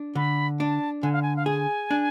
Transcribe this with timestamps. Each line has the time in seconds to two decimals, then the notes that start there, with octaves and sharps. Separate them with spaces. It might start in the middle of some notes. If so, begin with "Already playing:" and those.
Already playing: D4
0.15 D3 B5
0.59 D4 A5
1.02 D3 G#5
1.13 F5
1.22 G#5
1.36 F5
1.46 G#4 G#5
1.91 D4